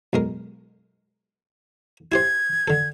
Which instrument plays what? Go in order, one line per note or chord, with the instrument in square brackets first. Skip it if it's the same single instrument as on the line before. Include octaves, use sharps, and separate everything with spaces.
[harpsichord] B1 G#3 A#4
[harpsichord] E4 G4 C5 [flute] G#6
[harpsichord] D3 A4